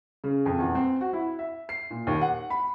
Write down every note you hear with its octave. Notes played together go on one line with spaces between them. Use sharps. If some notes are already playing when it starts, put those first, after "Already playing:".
C#3
F2
E2
C4
F#4
E4
E5
C7
A#2
D#2
F#5
B5